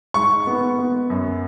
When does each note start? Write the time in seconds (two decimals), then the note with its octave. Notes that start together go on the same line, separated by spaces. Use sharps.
0.14 G#2 C#6
0.47 B3
0.79 B3
1.10 F#2